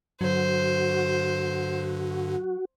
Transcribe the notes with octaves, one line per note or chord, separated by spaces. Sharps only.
G2 D3 F#3 F#4 C5